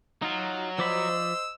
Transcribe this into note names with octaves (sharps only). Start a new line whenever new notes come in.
F#3 D#4 F4
F3 C5 D5 D#5 B5 E6